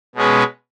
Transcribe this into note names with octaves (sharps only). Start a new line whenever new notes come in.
B2 G#3 C#4 G#4 B4